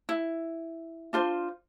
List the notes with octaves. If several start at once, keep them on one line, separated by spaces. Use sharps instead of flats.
E4
D4 F4 C5